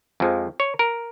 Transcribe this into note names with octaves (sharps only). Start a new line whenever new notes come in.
F2 F3 G#3
C#5
A#4